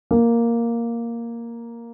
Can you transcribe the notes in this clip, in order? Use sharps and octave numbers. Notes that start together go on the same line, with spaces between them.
A#3